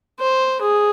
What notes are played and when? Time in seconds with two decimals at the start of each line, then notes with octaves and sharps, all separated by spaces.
0.20 C5
0.61 G#4